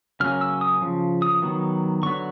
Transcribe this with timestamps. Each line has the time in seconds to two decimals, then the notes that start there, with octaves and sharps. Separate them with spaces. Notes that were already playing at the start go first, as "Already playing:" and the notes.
0.20 C#3 F#3 A#3 C#4 F6
0.41 E6
0.61 D#6
0.82 C#3 F3
1.22 D#6
1.42 D#3 F#3 B3
2.03 D3 F#3 B3 C#6